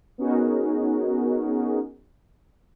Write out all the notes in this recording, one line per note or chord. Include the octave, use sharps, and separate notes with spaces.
B3 C#4 D#4 F#4 G#4 A#4